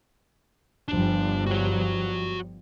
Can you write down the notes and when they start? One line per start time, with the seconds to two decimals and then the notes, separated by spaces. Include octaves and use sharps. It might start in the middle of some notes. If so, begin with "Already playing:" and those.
0.88 G1 F3 G3 D4
1.46 F#4 C#5